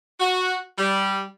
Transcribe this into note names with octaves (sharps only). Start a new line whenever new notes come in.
F#4
G3